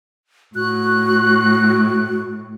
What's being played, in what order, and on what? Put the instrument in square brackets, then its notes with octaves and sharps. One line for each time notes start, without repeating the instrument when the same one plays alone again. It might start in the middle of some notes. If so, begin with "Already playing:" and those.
[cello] A2 [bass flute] F#4 [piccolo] F#6